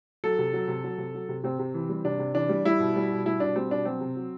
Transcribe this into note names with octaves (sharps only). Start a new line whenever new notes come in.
F#3 A4
C3
F#3
C3
F#3
C3
F#3
C3
C3 C4
C3
E3
G3
C3 D4
C3
E3 D4
G3
G3 E4
B2
G3
B2
G3 E4
B2 D4
G3 C4
B2 D4
F#3 C4
C3
F#3